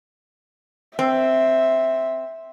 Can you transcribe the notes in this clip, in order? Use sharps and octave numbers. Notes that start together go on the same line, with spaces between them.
C4 E5